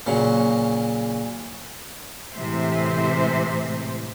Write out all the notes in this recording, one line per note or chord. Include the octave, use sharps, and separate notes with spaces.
A#2 C#3 F#3
A2 C3 E3 G#3 C5 E5